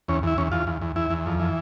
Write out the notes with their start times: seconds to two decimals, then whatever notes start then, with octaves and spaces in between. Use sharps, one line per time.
0.08 E2 C#4
0.23 E2 E4
0.38 E2 C#4
0.52 E2 F4
0.67 E2
0.82 E2
0.96 E2 E4
1.10 E2
1.26 F2
1.40 E3